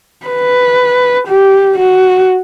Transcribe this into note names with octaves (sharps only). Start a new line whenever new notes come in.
B4
G4
F#4